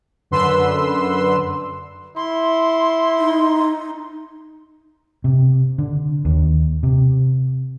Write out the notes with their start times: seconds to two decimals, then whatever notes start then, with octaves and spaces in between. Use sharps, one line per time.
0.31 F#2 D3 B4 C6 E6
2.16 E4 C6
3.19 D#4
5.24 C3
5.78 D3
6.25 D#2
6.83 C3